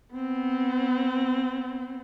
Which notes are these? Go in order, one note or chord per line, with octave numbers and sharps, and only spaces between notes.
B3 C4